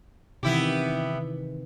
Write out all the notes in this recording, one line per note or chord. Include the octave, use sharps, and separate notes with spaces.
C3 D#3 E3 B3 E4 G4